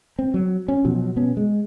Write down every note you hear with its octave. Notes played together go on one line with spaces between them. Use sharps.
C4
F#3
C#4
B2 F3 F#3
B2 B3 C#4
G#3